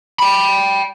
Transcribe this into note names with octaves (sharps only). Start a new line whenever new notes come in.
G5 B5